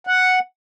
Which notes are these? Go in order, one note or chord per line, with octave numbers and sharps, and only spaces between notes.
F#5